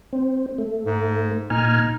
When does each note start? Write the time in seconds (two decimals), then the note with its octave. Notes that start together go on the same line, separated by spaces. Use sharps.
0.13 C4
0.58 A3
0.86 G#2
1.50 A#2 D#4 G#5 F6